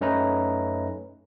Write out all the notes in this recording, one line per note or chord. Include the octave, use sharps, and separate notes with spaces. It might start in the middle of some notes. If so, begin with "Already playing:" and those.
F#2 A3 C#4 D#4 B4 A#5